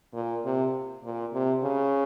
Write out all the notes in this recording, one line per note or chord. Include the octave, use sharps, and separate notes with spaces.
A#2
C3
A#2
C3
C#3